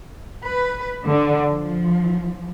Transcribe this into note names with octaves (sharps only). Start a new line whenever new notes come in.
B4
D3
F3